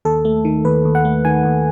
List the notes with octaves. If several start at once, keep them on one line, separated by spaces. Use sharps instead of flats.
D#2 A4
A3
D#3
D#2 B4
D#2
F#5
A3
D#3 G#5
D#2